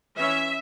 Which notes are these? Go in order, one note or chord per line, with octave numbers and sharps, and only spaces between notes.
E3 C#4 E5